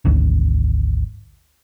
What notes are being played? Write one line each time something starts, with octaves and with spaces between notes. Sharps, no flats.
G#1 D2